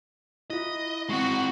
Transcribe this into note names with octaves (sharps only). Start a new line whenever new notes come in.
E4 F4 D#5
G#3 C4 F#4